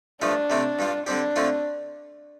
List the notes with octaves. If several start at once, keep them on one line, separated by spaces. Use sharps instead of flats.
G2 F3 A3 D4 F4
C3 A3 C4
G2 G3 F4
D3 G3 C4 D4 G4
D3 A3 C4 F4